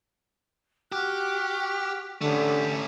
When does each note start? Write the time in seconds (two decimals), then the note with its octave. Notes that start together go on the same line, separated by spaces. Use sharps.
0.92 F#4 G4 F6 F#6
2.21 D3 A3 C#4 G4